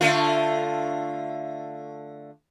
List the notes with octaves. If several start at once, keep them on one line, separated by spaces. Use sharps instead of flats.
D3 A3 F4